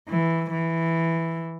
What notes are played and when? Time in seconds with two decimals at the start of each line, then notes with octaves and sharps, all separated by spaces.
0.09 E3
0.51 E3